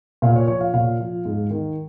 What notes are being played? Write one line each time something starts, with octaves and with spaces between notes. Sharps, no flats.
A#2 F5
C#5
F3 C#5
F5
A#2 F5
F3
G#2
D#3